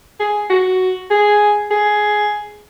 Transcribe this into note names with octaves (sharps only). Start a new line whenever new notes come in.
G#4
F#4
G#4
G#4